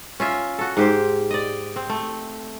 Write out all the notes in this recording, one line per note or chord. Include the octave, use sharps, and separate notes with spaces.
C#4 F4 E5
F#4 A4
G#2 G4 C5
D5 D#5
C4
A3